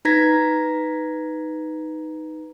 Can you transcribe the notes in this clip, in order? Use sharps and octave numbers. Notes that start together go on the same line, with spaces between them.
D#4 B4 A#5 G#6 A#6 B6